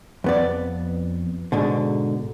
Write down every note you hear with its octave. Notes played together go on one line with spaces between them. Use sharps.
F2 B3 D5
G#2 B2 D3